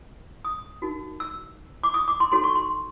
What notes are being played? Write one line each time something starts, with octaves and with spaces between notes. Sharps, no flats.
D#6
D#4 F#4 A#4
E6
D6
D#6
D6
C6
D#4 F#4 A4 C#5 C6
C#6
C6